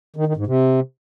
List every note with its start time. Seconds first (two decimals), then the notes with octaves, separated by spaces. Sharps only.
0.16 D#3
0.26 D#3
0.37 G#2
0.47 C3